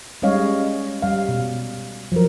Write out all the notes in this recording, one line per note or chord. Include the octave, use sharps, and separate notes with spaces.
G3 G#3 C#4 C#5 D#5 F5
G3 F5
B2
F3 F#3 A#4